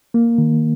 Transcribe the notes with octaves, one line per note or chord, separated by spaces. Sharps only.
A#3
D#3